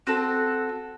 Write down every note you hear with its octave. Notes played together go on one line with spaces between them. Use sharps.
C4 F#4 A4